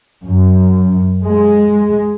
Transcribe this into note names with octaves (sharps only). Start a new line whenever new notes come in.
F#2
G#3